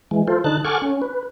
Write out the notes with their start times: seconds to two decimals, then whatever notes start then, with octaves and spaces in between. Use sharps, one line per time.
0.11 E3 G#3
0.27 F4 A4 C5
0.44 D3 D#4 A5 F#6
0.65 A4 F#5 G#5 C#6 D6 F6
0.82 C#4
1.02 B4